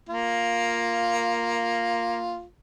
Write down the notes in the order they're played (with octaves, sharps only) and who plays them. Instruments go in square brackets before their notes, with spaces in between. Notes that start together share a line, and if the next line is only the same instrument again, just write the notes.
[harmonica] A#3 F4